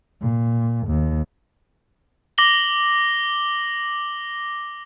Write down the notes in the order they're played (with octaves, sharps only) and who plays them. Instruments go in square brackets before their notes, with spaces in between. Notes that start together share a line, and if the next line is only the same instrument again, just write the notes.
[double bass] A#2
D#2
[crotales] D6 A#6 F#7 G7